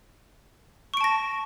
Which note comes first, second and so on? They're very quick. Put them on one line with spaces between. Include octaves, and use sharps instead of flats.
C#6 D7 A5 A#6